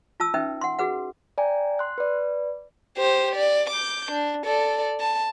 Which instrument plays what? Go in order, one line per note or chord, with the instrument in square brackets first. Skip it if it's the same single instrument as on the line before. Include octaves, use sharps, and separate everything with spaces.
[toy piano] F4 A5 E6
C#4 D#4 B4 E5 G5
F#5 C6
F#4 G#4 B4 F#5
[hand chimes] D5 G5 G#5 A#5
C6 F#6
B4 D5
[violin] G4 C5
D5
D6 G6
D4
A4 D5
A5